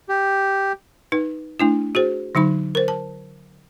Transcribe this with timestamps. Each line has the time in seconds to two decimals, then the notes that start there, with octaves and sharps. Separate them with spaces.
0.09 G4
1.12 D#4 B4
1.60 A3 D4 E4
1.95 F#4 G#4 C5
2.35 D3 F#3 D#4 B5
2.75 A#4 C5
2.88 A5